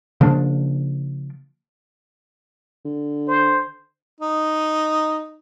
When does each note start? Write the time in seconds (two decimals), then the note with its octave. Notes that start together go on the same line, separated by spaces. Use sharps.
0.21 C#3 F3 A#3 D4
2.85 D3
3.28 C5
4.20 D#4